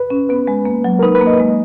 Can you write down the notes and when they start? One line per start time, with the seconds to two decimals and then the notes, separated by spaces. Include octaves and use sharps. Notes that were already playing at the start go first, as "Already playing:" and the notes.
Already playing: B4
0.10 C#4
0.29 B3 B4
0.47 G#3
0.65 A#3
0.84 F#3
0.99 A#4
1.03 D#4 B4
1.15 B4
1.21 A#3
1.27 D#5
1.40 G#3